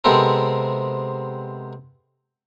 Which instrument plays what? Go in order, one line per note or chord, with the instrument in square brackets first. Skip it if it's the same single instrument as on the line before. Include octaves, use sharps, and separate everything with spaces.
[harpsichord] C3 G#3 B3 C4 A4 A#4